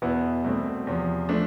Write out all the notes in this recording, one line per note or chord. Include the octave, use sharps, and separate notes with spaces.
E2 B2 B3 E4
C2 B2 A3 C4
E2 C3 F3
F3 A3 D4